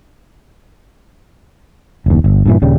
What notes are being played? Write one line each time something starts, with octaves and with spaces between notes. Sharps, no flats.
F#1 D#2
G1
G2 A#2 E3
D#1 C#3 G3